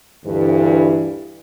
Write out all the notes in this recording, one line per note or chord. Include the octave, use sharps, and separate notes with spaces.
D2 G2 E3